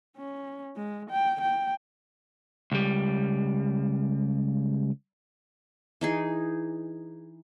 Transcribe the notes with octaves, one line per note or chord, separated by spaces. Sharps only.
C#4
G#3
G5
G5
C#2 G3
E3 D#4 G#4